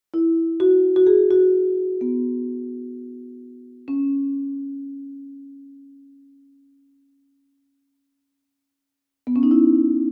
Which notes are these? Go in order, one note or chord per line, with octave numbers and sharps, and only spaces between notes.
E4
F#4
F#4
G#4
F#4
B3
C#4
B3
C#4
D#4
E4